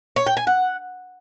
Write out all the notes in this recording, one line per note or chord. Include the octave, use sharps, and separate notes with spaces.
C#5
G5
G#5
F#5